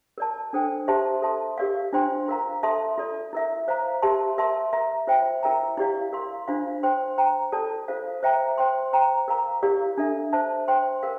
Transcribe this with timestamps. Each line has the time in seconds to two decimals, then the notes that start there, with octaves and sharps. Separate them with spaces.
0.18 A#4 D5 A5
0.53 D4 A4 C5 G5
0.88 G4 C5 E5 A5 C6
1.22 A4 E5 A5 C6
1.58 G4 A#4 D5 F5
1.93 D4 F4 C5 G5 C6
2.28 F4 A#4 F5 A#5
2.63 A4 E5 A5 C6
2.98 F4 A4 D5
3.33 E4 A#4 E5
3.68 C5 F5 A#5
4.02 G4 A#4 E5 A5 C6
4.38 A#4 E5 A5 C6
4.73 A#4 E5 A#5
5.07 F4 C5 E5 G5
5.43 E4 A#4 E5 G5 A#5
5.77 E4 G4 D5 F5
6.13 A#4 F5 C6
6.48 D4 F4 C5 F5
6.83 C5 G5 C6
7.18 C5 G5 A#5
7.52 F4 A4 D5 A5
7.88 F4 A4 C5 F5
8.23 C5 E5 G5 A#5
8.58 C5 G5 C6
8.93 C5 G5 A#5
9.28 A#4 F5 A#5
9.63 E4 G4 A#4 D5 F5
9.98 D4 A4 E5
10.33 C5 E5 A5
10.68 C5 G5 C6
11.03 A#4 F5